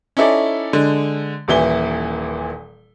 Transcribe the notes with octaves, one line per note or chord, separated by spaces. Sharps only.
C#4 D#4 E4 A4 D5
D3 G#3
D#1 A#2 E3 E4 G7